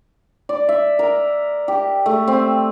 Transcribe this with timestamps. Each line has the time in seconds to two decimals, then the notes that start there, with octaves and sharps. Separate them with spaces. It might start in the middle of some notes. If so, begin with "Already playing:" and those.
0.49 D5
0.69 E5
0.99 A#4
1.68 G4
2.06 A3
2.27 C4